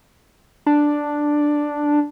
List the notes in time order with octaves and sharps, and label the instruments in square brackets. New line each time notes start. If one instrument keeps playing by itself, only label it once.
[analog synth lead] D4